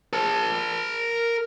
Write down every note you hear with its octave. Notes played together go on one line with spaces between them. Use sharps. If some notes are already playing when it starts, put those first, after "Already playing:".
A#4 A5